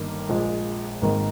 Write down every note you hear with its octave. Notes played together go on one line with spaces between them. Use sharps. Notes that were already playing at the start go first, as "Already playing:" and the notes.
Already playing: G1 G2 D#3 A#3
A#1 A#2 G#3
G#1 G#2 D#3 A#3